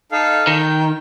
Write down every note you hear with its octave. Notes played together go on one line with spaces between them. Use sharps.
D#4 A4 F5
D#3 G5